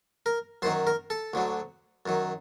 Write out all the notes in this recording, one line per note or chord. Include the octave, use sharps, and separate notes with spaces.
A#4
F#2 D#3 F#3 C5
A#4
A4
D2 D3 F#3
F#2 D#3 F#3